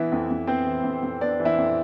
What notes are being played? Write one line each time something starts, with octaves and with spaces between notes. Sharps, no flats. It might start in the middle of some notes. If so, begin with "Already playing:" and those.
Already playing: E3 B3 E4 E5
F2
F2
B3 C4 C5
E3
F2
F2
B3 D4 D5
E3
E4 E5
F2